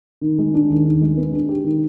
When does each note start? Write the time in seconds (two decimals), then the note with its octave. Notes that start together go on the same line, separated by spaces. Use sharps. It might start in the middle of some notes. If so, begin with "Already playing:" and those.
0.21 D#3
0.39 G#3
0.54 D4
0.69 D#2
0.85 D#3
1.02 G#3
1.17 B3
1.33 D4
1.49 G4
1.64 D#3